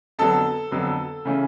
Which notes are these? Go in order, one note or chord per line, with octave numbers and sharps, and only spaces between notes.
F2 D3 F#3 B3 A4 A5
F2 D3 F#3 B3
C#3 E3 A3 C#4